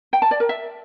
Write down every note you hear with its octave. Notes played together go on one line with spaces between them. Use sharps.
G5
A5
D5
A#4
E5